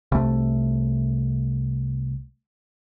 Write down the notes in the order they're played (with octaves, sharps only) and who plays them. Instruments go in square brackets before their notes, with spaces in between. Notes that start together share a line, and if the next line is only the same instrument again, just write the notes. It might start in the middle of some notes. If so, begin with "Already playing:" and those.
[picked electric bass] C2 A3